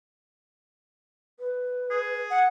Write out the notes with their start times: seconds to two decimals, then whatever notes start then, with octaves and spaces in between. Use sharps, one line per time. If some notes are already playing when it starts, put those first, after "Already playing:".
1.40 B4
1.91 G#4
2.30 F#5